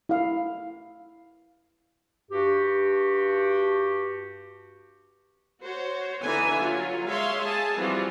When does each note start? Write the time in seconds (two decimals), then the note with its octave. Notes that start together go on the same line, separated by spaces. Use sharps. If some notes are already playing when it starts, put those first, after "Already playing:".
0.09 E4 F5
2.31 G2 F#4 G4
5.60 F#4 C5 C#5
6.23 D3 E3 D#4 B4 E5 G#5
6.56 F#3 F4
7.07 G#3 C#5 E5 F5 C6
7.43 G#4 G#5 A5
7.77 E3 F3 G3 C4 F4 F#4